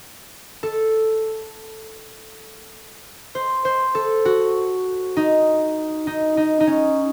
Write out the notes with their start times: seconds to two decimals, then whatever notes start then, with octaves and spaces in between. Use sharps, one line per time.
0.63 A4
3.35 C5
3.65 C5
3.95 A4
4.25 F#4
5.17 D#4
6.07 D#4
6.37 D#4
6.60 D#4
6.67 C#4